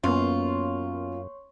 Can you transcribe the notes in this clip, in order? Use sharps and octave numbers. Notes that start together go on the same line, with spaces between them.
F#2 A#3 B3 C#4 F4 C#5 C6 C#6